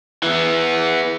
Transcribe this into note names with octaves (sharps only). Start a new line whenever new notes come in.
E3 B3